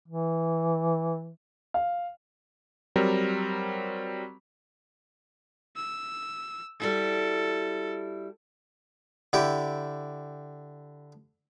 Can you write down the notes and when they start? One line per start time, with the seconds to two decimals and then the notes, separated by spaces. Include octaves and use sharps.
0.08 E3
1.74 F5
2.96 F#3 G3 C4 A#4
5.76 E6
6.80 G3 E4 F#4 A4
9.33 D3 E4 G4